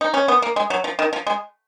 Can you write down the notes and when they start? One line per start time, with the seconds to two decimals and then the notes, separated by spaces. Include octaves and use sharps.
0.01 D#4
0.14 C#4
0.28 B3
0.42 A#3
0.56 G#3
0.70 F#3
0.84 F3
0.99 D#3
1.13 F3
1.27 G#3